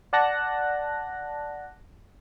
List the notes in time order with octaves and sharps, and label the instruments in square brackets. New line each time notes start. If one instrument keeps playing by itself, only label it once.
[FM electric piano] D5 F#5 A5 F#6 A#6